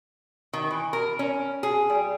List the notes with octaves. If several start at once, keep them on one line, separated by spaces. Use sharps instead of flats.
D#3
E3
A#4
C#4
G#4
G3